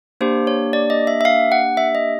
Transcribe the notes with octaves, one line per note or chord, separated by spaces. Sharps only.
A#3 D4 G4 C5
C#5
D5
D#5
E5
E5
F5
F#5
E5
D#5